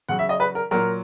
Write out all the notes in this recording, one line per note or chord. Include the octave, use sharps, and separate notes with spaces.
C#3 F#3 F#5
E5
D#5
B4
A#4
A#2 F#3 A#4